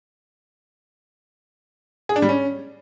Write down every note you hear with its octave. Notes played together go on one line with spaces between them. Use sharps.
G#4
D4
G3
C#4